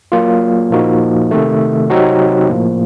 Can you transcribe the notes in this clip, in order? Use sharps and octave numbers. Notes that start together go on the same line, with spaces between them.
F#3 A#3 F4
A#2 F3 A#3 D#4 F#4
C3 D#3 A3
C3 F#3 C4 D#4 F#4
A2 F3 A#3